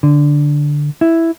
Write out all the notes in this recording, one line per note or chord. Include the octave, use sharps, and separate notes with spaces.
D3
E4